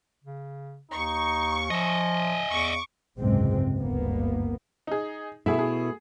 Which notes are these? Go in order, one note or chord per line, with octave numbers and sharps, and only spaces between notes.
C#3
D#2 D#4 C#6
F3 D#5 E5 G#5
E2 C#6 D6
F#1 C#2 G#2 C3 G#3 C4
G1 D2 A#3 B3
D#4 G#4
B2 A3 E4 G#4 E5
G#4